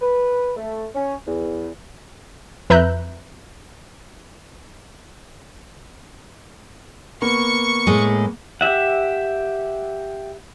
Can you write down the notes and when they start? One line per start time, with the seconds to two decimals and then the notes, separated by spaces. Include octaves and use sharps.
0.01 B4
0.55 A3
0.94 C#4
1.26 E2
2.70 F2 B4 E5 A#5 F#6 G6
7.22 A#3 B3 C#6
7.87 A2 G#3
8.61 G4 E5 F#5